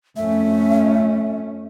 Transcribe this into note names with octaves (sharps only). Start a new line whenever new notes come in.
F2 A3 C#4 E5